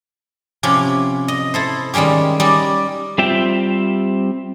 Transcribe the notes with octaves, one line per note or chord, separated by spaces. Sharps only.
C3 F3 C#4 E4 G4
D#5
E4 A4 C5
D#3 G3 G#3 C#4 G4
G3 C#4 D#4 D5
G3 C4 F4 E5 G5